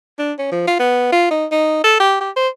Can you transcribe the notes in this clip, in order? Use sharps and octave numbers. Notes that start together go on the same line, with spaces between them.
D4
C#4
F3
F4
B3
F4
D#4
D#4
A4
G4
G4
C5